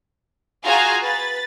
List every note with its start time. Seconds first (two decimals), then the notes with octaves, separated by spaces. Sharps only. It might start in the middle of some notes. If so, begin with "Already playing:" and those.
0.65 F4 F#4 G#4 F5 G#5 A#5
1.03 B4 A6